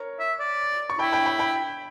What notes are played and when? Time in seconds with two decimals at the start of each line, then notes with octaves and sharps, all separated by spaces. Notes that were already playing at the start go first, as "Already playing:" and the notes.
Already playing: A#4 C#5
0.20 E5
0.39 D5
0.90 C#6
0.99 E4 G5 B5
1.12 G5 B5
1.26 G5 B5
1.39 G5 B5